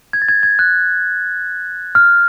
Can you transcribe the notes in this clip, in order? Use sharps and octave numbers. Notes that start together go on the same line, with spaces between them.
G#6
A6
G#6
G#6
F#6
F6